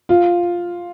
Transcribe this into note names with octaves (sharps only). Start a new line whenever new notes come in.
F4